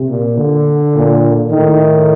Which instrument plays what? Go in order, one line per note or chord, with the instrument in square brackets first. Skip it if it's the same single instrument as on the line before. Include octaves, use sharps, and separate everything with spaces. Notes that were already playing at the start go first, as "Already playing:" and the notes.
Already playing: [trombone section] C3
[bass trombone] A#2
D3
[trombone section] A#2
[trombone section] A2 [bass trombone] D#3